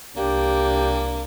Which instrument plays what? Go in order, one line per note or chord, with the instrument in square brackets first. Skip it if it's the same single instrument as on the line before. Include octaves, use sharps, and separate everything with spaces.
[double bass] C2 D4 [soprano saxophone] A#3 [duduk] G4